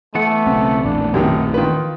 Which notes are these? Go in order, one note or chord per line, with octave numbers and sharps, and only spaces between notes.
E3 A3 B3 F#5
B1 C#3 C4
A#1 E2 A2 D4
F#2 C3 D#3 A3
D#3 F4 B4